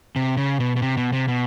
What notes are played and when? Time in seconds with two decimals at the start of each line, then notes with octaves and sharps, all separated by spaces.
0.16 C3
0.37 C#3
0.60 B2
0.76 B2
0.82 C3
0.97 B2
1.13 C3
1.28 B2